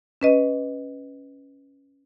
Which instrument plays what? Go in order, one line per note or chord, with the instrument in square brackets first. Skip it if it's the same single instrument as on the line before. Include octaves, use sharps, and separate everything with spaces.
[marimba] C#4 B4 D#5